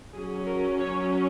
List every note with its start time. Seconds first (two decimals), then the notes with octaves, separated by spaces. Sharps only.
0.14 F#3 C#4 G#4
0.46 A#4
0.79 C#5